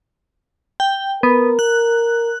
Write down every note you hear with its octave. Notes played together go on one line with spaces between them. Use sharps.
G5
B3 A#4
F#6